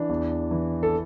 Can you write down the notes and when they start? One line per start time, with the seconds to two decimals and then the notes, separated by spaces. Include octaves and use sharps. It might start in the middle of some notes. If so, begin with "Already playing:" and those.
Already playing: E3 D4
0.09 E2
0.51 E3
0.83 A4